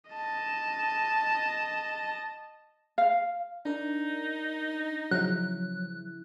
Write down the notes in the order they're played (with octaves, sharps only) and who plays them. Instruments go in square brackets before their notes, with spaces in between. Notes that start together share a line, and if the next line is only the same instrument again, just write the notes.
[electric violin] D#5 A5
[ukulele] F5
[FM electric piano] D4 A#4 [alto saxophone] D#4
[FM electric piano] C#3 F3 E4 [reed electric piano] F#3 [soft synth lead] F#6